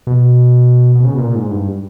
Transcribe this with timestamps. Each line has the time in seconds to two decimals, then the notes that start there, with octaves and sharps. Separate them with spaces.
0.07 B2
0.95 B2
1.03 C#3
1.14 B2
1.18 A#2
1.35 G#2
1.51 G2